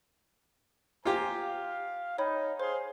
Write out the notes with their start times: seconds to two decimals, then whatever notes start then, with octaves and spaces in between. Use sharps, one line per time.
1.05 F4 G4 C5 G#5 A#5
1.41 F5
2.18 D#4 C#5 G5 B5
2.60 G#4 C5 F5 C6